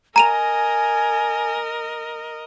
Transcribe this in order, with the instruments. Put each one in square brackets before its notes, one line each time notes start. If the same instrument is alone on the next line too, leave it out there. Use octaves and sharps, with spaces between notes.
[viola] A#4 D#5 [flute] G#5 [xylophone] A#5 D#7 F7